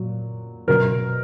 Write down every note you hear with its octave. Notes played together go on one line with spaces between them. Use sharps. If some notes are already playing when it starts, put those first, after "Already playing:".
Already playing: A#2 F#3
B2 F#3 A#4